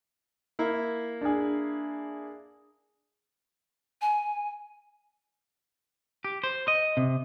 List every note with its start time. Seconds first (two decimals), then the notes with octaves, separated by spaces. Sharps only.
0.59 A#3 E4
1.21 D4 G#4
4.01 G#5
6.25 G4
6.44 C5
6.68 D#5
6.97 C3